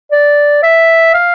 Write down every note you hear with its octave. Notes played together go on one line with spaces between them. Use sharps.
D5
E5
F5